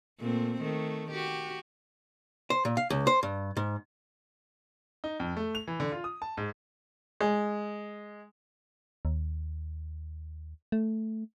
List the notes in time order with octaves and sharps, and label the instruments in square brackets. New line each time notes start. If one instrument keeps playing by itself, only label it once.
[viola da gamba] A#2 A3 C4
D#3 A3
F#4 G4
[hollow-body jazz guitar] C5
A#2
F5
C#2
C5
G2
G#2
[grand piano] D#4
F2
A3
F7
E3
D3
F4
D#6
A5
G#2
[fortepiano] G#3
[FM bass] D#2
A3